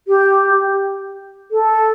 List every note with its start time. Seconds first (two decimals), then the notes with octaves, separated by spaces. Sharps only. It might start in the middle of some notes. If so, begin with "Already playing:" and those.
0.08 G4
1.51 A4